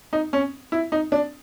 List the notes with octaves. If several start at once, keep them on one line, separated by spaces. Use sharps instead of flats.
D#4
C#4
E4
D#4
D4